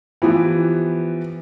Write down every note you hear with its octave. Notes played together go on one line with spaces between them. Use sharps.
E3 F3 B3 G4